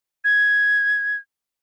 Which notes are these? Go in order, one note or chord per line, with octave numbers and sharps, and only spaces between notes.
G#6